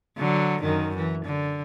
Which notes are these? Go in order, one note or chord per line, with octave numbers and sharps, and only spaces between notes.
D3 F#3
F#2 D#3
E3
D3